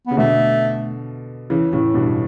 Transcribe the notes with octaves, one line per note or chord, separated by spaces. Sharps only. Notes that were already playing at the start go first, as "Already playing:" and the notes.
C#3 B3
B2 D3 A3
C#3 E3
A2 C#3
G2 B2